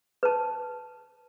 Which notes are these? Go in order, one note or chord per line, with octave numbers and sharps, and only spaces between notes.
B4 A5